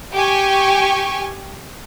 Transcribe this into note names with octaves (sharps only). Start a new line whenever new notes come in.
G4 G5 G#5 C#6